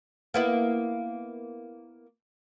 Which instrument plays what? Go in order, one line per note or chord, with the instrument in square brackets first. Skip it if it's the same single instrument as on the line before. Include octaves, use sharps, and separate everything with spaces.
[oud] A#3 B3 E4